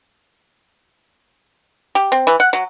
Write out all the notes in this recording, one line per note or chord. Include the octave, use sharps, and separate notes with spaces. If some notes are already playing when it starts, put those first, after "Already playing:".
G4
C4
E3
F#5
F#3